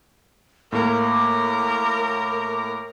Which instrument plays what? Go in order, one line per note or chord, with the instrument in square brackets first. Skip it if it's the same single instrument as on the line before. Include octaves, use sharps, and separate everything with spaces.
[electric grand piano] A2 A#3 [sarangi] A#4 [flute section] D6